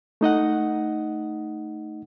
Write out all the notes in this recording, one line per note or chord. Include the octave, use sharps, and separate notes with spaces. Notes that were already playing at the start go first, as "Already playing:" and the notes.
A3 D#4 D#5 F#5